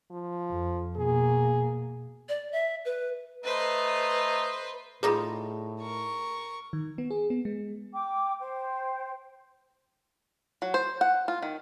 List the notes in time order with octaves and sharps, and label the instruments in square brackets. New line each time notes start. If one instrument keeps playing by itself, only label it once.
[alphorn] F3
[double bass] F2
[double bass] B2 A#3 [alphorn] G#4
[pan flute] D5
E5
B4
[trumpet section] A3 D#5 A#5 [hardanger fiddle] B4 C5
[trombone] A2 [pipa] G3 D#4 F4 [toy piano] G#4 A4 B5
[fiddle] A#4 C#6
[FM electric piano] D#3
B3
G#4
B3
G#3
[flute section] G5 D6
C5 G5
[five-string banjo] F#3
C5
F#5
F4
D#3